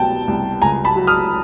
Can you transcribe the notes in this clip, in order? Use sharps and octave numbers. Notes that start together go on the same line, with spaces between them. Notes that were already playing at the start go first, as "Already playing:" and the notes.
Already playing: C2 B2 F#3 G5 A5
C2
C#2 G#5 A#5
A5 B5
F#3
D#6 F6